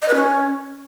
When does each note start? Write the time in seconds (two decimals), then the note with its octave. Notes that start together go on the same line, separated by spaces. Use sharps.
0.02 D#5
0.08 B4
0.15 C#4